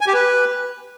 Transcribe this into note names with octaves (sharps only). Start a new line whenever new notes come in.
G#5
G4
B4